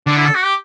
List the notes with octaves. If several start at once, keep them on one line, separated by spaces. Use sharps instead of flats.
D3 D4
E4
A4
F#4
G4